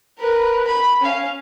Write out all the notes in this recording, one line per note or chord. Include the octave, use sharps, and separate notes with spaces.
A#4 B4
B5
C#4 F5